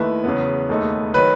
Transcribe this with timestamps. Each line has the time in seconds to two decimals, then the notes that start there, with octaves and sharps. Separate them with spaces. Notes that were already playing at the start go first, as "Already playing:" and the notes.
Already playing: D#2 D#3 A3 E4 B4
0.24 E2 C#3 F#3 B3
0.69 E1 D#2 D#3 A3 D#4
1.14 D#3 F#3 B4